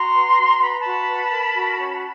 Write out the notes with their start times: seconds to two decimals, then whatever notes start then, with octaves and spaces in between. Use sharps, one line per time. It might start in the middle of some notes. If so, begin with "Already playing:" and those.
Already playing: F#4 A#5 C6
0.14 B4
0.38 F#4
0.61 B4 B5
0.70 A#5
0.78 A5 B5
0.85 F#4
1.08 B4
1.32 A#4
1.55 F#4
1.79 C#4